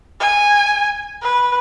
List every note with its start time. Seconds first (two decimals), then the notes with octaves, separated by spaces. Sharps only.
0.20 G#5
1.21 B4